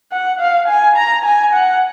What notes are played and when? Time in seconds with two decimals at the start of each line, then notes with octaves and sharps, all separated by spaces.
0.12 F#5
0.40 F5
0.68 G#5
0.96 A#5
1.24 G#5
1.53 F#5